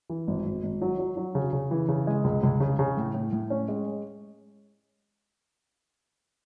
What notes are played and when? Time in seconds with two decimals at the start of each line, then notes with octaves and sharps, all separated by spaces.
0.10 E3
0.27 G#1
0.45 G#1
0.63 G#1
0.82 F#3
0.99 F#3
1.17 F#3
1.35 C#3
1.53 C#3
1.71 E3
1.88 C#3
2.07 G#3
2.24 C#2
2.43 C#2
2.60 C#3
2.79 C#3
2.97 A2
3.14 A2
3.32 A2
3.50 C#4
3.68 G#3